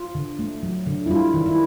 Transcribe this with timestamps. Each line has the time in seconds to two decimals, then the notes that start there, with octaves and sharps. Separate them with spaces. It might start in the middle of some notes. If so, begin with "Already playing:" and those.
Already playing: F4
0.15 D3
0.39 A3
0.63 F#3
0.86 D3
1.06 E4
1.10 G3 F4
1.34 D#3
1.46 E4